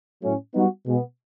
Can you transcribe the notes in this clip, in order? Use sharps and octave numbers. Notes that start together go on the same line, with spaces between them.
A2 F#3 A3 C#4
G3 B3 D#4 F#4
B2 G#3 B3